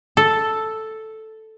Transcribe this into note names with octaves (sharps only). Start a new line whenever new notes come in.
A4